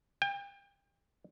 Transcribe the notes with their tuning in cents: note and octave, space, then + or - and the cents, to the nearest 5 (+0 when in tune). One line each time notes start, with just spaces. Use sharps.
G5 +35